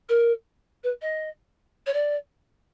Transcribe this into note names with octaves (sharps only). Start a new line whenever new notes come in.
A#4
B4
D#5
C#5
D5